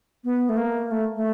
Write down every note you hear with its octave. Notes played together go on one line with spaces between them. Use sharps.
B3
A3
A#3
A3
A3